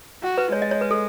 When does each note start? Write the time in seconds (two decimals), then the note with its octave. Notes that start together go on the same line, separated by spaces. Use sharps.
0.23 F#4
0.38 B4
0.52 G#3 C#5
0.62 D#5
0.71 C#5
0.81 B4
0.91 A4